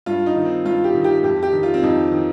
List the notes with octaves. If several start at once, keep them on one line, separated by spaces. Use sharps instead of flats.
G2 F4
D#4
D#3
C4
G2 F4
G4
D#3
G4
F2 G4
G4
D#3
F4
C4
F2 D#4
D#3